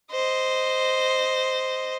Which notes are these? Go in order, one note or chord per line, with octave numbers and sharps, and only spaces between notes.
C5 D#5